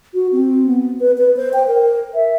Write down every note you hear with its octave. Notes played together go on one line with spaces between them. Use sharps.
F#4
C4
B3
B4
B4
C5
G5
A#4
E5